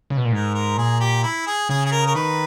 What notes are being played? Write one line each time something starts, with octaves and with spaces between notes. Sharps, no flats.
C#3
B2
A#2
G#2 A#4
A#4
A#2 G#4
G4
E4
G#4
C#3 G#4
G#4
A#4
A#4
D#3 B4